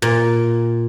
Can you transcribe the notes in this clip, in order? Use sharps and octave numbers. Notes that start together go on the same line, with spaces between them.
A#2